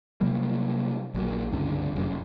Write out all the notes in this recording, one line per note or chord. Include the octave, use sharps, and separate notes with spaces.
C3 F#3 G3 A#3
A#1 A#2 F#3 A#3
C#2 G2 D3 C4
F1 F#2